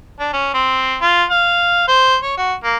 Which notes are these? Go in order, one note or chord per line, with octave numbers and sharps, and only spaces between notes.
D4
C#4
C4
F4
F5
C5
C#5
F#4
A#3